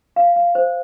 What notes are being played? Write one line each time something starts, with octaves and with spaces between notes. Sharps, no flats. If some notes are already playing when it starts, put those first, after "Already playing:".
F5
F5
C5